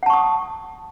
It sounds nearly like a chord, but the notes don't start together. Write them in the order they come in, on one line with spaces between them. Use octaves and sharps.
F#5 A5 C#6 D#6